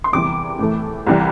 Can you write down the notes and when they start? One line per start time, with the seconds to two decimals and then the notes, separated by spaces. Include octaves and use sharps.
0.04 C6
0.12 E2 C3 E3 G3 D6
0.59 A2 E3 A3
1.07 C2 C3 E3 G3